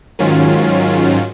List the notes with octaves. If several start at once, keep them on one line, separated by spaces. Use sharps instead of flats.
G#2 D#3 F#3 C#4 F4